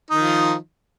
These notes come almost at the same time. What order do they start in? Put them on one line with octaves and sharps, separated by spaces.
D#4 D#3 F3